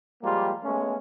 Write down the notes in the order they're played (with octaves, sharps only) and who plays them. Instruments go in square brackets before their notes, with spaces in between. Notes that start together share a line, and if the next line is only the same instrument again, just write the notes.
[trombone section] F3 G3 G#3 A#3 F4 G4
G#3 A3 B3 C#4